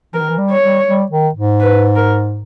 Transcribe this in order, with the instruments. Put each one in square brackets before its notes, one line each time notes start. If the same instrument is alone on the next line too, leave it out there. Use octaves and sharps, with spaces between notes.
[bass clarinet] E3 [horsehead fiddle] A#4
[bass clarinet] D#3
E3
G3
[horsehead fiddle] C#5
[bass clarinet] G3
G3
D#3
G#2
[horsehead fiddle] B4
A#4